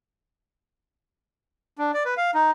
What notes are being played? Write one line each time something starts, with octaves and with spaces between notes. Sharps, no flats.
D4
D5
B4
F5
D#4